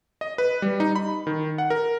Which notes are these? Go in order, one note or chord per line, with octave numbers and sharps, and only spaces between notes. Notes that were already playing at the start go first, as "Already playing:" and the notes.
D#5
B4
G3
D#4
B5
D#3
F#5
A#4